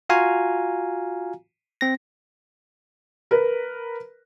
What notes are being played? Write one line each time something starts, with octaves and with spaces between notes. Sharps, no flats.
F4 F#4 F5 G#5 A#5
C4 A#6
A#4 B4